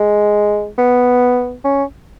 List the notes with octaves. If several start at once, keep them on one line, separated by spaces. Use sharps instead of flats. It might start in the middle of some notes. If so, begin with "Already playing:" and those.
Already playing: G#3
B3
C#4